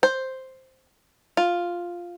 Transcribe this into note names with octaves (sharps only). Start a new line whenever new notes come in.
C5
F4